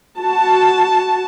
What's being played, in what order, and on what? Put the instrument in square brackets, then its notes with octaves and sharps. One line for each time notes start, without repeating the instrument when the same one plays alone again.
[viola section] F#4 A5